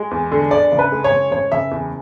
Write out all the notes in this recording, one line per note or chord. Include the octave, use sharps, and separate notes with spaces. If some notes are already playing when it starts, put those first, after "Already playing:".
Already playing: G#3
E2
D3
D3 D5
F#1
B4
G#3
C#5
F#1
F#1 C#5
F#1 E5
E2